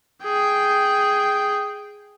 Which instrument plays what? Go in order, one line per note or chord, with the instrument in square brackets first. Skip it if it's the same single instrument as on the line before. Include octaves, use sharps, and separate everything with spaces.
[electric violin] G#4 G5